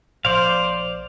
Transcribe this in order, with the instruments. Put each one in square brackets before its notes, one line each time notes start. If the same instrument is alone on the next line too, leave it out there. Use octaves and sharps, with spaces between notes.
[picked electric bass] A#1 [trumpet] C5 [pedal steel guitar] D5 F5